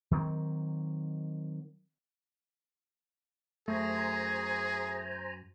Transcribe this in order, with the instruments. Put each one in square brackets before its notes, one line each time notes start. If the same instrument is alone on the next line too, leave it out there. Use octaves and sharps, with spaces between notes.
[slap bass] D#3 F#3 A#3 C4
[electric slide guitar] F#2 [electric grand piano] A3 [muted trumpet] G#4 [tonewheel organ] C5 G#5 A#5